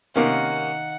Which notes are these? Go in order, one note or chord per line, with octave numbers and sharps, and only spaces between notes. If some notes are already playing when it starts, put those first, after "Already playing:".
C3 D#3 A#3 C#4 A#4 F5 F#5